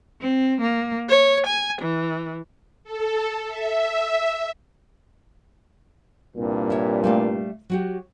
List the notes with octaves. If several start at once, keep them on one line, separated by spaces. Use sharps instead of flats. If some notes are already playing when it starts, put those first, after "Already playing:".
C4
A#3
C#5
G#5
E3
A4
E5
C2 G2 A#2
E4 C#5
G3 A3 F5
F#3 F#4 G4